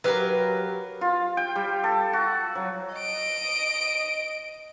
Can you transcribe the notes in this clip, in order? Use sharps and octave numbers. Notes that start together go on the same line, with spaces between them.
F#3 G4 A#4 B4 F5
F4
G5
G3
A4
F#4
F#3
D#5 D7